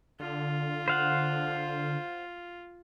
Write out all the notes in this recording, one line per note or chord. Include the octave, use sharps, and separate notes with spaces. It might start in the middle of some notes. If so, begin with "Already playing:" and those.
D3 F4
C5 F5 F#5